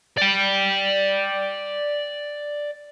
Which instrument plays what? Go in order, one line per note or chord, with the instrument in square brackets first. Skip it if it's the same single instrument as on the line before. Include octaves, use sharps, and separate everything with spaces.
[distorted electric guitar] D5 G5